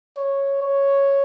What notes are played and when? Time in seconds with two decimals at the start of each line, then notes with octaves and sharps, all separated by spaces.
0.17 C#5
0.62 C#5